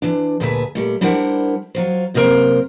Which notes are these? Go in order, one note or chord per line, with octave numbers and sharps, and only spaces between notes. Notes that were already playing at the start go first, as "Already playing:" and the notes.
E3 D4
D2 A#2 G#4 B4 E5 A5
A#2 G3 A3
G3 D4 E4 A#4 C5 F#5
F#3 F4 C5
F#2 C3 A#3 D4 A#4 C5